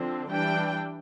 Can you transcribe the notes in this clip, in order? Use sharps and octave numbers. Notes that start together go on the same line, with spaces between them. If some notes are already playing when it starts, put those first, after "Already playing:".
Already playing: D3 F3 C4
E3 G3 D4 G5